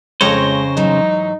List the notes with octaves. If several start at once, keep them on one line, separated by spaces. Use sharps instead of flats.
F2 C#3 G#3 C5 C#5 A#6
G#2 E3 F#3 D#4